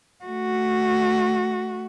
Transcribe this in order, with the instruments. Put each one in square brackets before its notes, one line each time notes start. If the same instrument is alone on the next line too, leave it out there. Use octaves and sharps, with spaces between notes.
[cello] A3 F#4